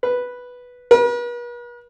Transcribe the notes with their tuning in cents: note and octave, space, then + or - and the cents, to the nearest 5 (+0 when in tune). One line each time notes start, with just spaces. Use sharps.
B4 -5
B4 -45